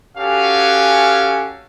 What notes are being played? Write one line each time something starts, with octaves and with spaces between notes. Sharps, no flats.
C#4 F#4 G4 A4 F5 G#5